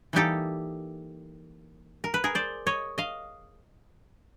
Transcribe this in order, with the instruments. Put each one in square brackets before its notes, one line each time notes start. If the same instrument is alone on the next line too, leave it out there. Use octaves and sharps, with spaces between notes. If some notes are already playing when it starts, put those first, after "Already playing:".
[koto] E3 G3 A#3 D#4 G4 A4
A#4
B4
G#4 A#4
C5 D5
C#5 D#5
D#5 F5